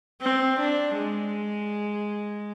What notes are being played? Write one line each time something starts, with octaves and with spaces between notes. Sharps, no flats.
C4
D4
G#3